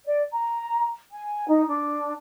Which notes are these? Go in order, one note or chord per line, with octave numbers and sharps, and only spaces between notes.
D5
A#5
G#5
D#4
D4